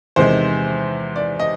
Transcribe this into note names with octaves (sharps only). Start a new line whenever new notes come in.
E2 C3 D#3 G#3 C5
D5
D#5